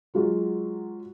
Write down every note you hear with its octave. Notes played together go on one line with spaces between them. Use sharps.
F#3 G#3 F4 F#4